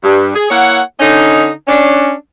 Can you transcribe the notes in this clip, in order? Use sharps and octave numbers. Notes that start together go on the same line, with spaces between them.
G2
G#4
A#3 E4 C#5 F#5
D3 C#4 D#4
C#4 D4